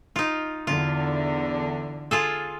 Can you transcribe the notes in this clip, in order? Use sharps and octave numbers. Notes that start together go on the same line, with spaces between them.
D#4 F4
E2 D3 F4
F4 G#4 A4